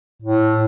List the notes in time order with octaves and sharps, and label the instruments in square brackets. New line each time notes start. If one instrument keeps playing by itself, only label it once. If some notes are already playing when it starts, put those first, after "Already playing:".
[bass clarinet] A2